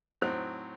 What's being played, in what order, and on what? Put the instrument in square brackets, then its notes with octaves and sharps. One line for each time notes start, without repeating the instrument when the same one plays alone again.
[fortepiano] A2 F#3 C4 D#4 [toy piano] C5